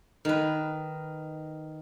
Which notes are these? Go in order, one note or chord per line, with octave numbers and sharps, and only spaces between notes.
D#3 B4